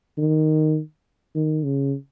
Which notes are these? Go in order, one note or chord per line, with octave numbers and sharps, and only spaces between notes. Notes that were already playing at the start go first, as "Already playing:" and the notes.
D#3
D#3
C#3